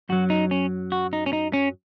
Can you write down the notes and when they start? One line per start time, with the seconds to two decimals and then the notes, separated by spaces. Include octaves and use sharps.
0.09 F#2 F#3 F#4
0.30 D#4
0.51 C#4
0.92 F#4
1.13 D#4
1.26 C#4
1.33 D#4
1.53 C#4